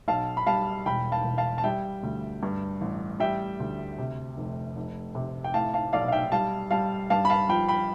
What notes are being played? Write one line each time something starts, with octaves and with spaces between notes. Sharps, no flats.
B1 F5 A5
B5
G3 F5 A5
E1 G5 B5
F5 A5
E1
F5 A5
A5
G3 E5 G5
D2
G2
A1
G3 E5 G5
D2
C3
F1
F1
C3
G5
A2 F5 A5
F5 A5
B1 D5 F5
F5
E5 G5
G3 F5 A5
G3 F5 A5
G2 F5 A5
B5
F5 A5
F3 G5 B5
G5 B5